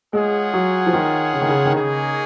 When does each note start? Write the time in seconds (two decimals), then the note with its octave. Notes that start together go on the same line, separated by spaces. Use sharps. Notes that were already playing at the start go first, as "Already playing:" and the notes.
0.13 G#3 F4 G#4 C#5 F#5
0.53 F#3
0.87 F3
0.93 D#3
1.33 C#3
1.41 D#3
1.48 C#3
1.65 D#3
1.74 C#3 A#3 D#4 G#4 C#5